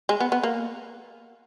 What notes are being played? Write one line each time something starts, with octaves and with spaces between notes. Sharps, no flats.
G#3
B3
B3
A#3